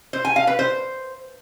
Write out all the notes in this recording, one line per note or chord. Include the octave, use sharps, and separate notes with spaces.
C5
G#5
F5
B4
C5